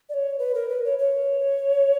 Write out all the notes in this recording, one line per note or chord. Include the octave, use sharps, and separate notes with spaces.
D5
C#5
B4
A#4
B4
C#5
C#5